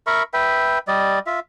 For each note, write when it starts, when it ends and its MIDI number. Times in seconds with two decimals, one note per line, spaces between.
0.07 0.23 70
0.07 0.23 76
0.07 0.23 83
0.07 0.23 85
0.33 0.79 71
0.33 0.79 76
0.33 0.79 79
0.88 1.19 55
0.88 1.19 74
0.88 1.19 75
1.26 1.40 65
1.26 1.40 76